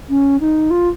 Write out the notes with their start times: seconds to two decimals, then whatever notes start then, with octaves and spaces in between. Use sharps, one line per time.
0.09 C#4
0.40 D#4
0.70 F4